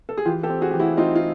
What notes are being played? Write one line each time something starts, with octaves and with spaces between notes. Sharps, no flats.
A4
G#4
E3 F4 G4
G4 A4
C4
F#4 G#4
E3 G4
E4 F#4
C4 D#4 F4
F4